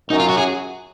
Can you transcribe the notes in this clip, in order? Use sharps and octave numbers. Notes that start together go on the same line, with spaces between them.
F#2 D#4
F4
F#4
G#4